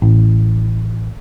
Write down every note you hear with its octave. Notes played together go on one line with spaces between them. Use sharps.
A1